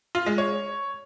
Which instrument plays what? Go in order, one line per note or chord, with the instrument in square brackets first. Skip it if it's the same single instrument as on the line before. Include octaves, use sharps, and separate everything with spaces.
[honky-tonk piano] F4
G#3
C#5